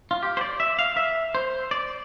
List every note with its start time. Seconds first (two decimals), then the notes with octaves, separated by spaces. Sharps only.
0.11 F4
0.23 G4
0.37 C5
0.41 D5
0.60 E5
0.79 F5
0.97 E5
1.35 C5
1.71 D5